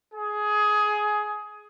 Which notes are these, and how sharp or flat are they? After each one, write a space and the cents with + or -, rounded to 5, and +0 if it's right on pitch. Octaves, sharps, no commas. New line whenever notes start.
G#4 +15